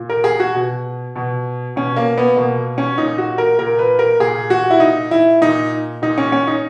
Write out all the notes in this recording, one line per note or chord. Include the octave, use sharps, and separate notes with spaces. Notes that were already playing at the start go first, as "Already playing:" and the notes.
Already playing: A#2
A#4
G#4
F#4
B2
B2
B2 C#4
A#3
B3
B2 A#3
C#4
A#2 D#4
F#4
A#4
A#2 A#4
B4
A#4
A#2 G#4
F#4
E4
A#2 D#4
E4
A#2 D#4
A#2 D#4
C#4
C#4
D#4